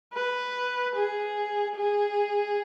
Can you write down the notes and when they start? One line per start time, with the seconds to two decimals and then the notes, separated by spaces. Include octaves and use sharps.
0.14 B4
0.95 G#4
1.77 G#4